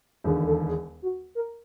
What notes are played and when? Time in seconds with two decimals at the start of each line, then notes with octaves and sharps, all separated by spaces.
0.24 E1 D#2 D3 G#4
0.46 A4
0.67 G#4
1.03 F#4
1.35 A#4